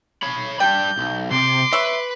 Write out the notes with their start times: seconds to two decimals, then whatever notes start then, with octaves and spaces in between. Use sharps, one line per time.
0.23 C#5 B5
0.60 G3 D4 G5 G6
0.98 B1
1.31 C3 C6 D6
1.73 B4 C#5 E5